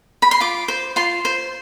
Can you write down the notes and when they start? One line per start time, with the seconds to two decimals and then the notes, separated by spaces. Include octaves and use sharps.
0.22 B5
0.31 C6
0.40 F4 D6
0.68 C5
0.96 F4 C6
1.25 C5